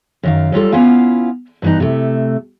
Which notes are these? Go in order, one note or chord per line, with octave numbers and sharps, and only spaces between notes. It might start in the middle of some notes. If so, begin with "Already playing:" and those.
F#2 D#3 F5
F#3 G3 F4 A4
B3 C#4 E4 F4 F5 F#5
G2 E3 A#3 B3 D#4
C3 A3